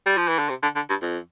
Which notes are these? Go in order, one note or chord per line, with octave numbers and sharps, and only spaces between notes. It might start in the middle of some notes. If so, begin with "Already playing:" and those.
G3
F3
E3
D3
C3
D3
D3
G2
F2